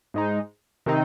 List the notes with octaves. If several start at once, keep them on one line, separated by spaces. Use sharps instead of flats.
G#2 G#3 D#4
C3 D#3 C4 D#4